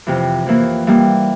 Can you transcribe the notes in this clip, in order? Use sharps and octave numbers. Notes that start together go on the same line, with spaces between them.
F2 C3 E3
F2 E3 A#3
E3 G3 A#3